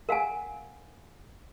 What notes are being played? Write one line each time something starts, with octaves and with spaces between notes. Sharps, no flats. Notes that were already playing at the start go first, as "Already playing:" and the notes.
A#4 F5 F#5 G#5